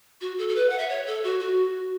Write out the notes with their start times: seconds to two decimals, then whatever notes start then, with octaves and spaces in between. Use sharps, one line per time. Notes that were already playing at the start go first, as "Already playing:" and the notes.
0.21 F#4
0.38 A4
0.49 A4
0.55 B4
0.69 F#5
0.78 E5
0.89 C#5
1.07 A4
1.24 F#4
1.40 F#4